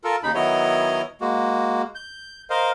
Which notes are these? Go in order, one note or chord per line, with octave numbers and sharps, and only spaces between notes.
F4 A4 A#4
D#2 C#3 D#4 B5
D#3 F#3 B3 E4 C#5 D#5
G#3 A#3 F#4
G6
A#4 C5 D#5 F5